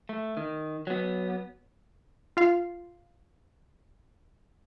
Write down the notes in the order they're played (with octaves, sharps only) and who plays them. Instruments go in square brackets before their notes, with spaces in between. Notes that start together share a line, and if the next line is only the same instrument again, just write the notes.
[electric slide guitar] A3
D#3
F#3 B3
[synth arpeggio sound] F4 F5